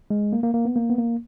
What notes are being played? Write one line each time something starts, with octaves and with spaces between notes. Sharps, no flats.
G#3
A#3
A#3
A#3
B3
A#3
B3
A#3